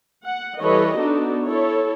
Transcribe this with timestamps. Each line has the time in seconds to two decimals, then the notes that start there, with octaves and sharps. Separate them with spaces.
0.24 F#5
0.60 E3 G3 A4 B4 C#5 D#5
0.98 B3 D4 D#4 F#4 A4
1.43 E4 A4 C#5